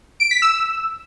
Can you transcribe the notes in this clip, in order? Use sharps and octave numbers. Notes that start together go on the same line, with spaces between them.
D7
B6
E6